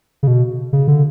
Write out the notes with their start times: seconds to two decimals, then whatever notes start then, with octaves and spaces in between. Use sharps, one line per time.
0.23 C#3
0.27 B2
0.73 C#3
0.88 D3